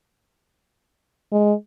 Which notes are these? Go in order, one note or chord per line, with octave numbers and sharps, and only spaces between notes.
G#3